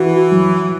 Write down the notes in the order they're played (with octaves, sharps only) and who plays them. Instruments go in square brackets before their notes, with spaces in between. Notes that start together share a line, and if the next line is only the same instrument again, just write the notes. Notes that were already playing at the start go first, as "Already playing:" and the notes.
Already playing: [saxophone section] E3 [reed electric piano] F#4
[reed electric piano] F#3